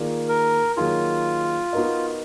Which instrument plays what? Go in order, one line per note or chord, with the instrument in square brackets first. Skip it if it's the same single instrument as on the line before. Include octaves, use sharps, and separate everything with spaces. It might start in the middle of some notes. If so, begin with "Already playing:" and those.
Already playing: [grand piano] D#3 A#3 F4 G#4 D5
[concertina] A#4
[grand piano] D#3 F#3 A#3 D#4 G#4 [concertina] F4
[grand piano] B3 D#4 F#4 A#4 D#5